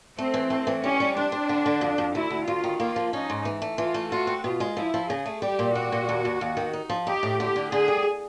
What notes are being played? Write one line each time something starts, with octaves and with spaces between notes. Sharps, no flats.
A3 C4
E3
A3
E3
G3 C#4
G3
C4 D4
C4
D3
D3
F2
F2
D2 E4
D2
D2 F4
D#3
A#3 F4
F3
C#4 D#4
G#2
E3
A3
E3 F4
A3
F4 F#4
C4
B2 F4
G#3
F3 E4
F3
C#3 G#4
A3
G3 G4
A#2
G3 F#4
A#2
D#2
D#2
D#2
D#3
D#4
F3
D#4 G4
A2
D3 G4
D3
D3 G#4
G3